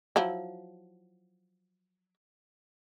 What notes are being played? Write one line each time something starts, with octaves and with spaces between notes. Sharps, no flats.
F3 F#3 E4